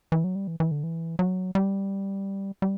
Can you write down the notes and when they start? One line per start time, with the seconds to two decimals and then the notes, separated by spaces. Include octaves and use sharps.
0.12 E3
0.24 F#3
0.35 G3
0.48 E3
0.60 E3
0.71 D3
0.84 E3
1.19 F#3
1.55 G3
2.62 G3